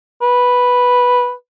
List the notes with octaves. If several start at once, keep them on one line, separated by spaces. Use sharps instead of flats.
B4